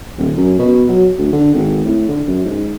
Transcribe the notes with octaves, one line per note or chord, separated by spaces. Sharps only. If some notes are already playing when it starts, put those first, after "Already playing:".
D#1
F#2
B2
F#3
D2
D3
G#1
A2
D3
F#2
G#2